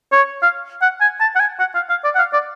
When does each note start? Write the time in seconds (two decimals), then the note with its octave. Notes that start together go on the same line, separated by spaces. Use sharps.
0.12 C#5
0.42 F5
0.82 F#5
1.01 G#5
1.21 A5
1.36 F#5
1.40 G#5
1.59 F#5
1.75 F5
1.90 F5
2.04 D5
2.15 F#5
2.18 F5
2.33 D5